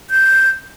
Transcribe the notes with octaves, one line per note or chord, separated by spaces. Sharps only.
G6